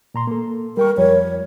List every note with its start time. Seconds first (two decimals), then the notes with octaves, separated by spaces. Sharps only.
0.14 A#2 A#5 C6
0.27 A#3 A4
0.77 G3 A#4 G5 C#6
0.97 F2 F3 G3 C#5